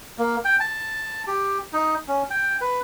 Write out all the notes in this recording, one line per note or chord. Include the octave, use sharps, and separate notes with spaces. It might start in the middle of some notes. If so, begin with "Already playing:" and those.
A#3
G5
A5
G4
D#4
C#4
G5
B4